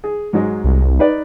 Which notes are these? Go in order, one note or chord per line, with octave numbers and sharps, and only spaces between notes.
G#4
G#2 F#3 G#3
C2
D#4 B4 D5